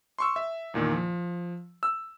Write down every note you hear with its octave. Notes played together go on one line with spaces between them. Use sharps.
C6 C#6 E6
E5
E2 A#2 D#3 A#3
F3
E6